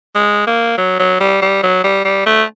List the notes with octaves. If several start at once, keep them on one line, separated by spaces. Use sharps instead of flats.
G#3
A#3
F#3
F#3
G3
G3
F#3
G3
G3
A3